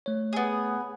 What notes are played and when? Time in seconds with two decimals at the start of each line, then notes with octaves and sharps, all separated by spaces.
0.06 A3 C#5
0.33 B3 G#4